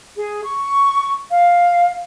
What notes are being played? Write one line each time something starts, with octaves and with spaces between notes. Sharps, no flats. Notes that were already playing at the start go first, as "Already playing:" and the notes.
G#4
C#6
F5